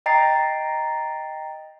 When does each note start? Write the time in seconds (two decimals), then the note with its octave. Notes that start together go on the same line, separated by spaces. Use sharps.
0.06 D#5 G5 A#5 A6 C7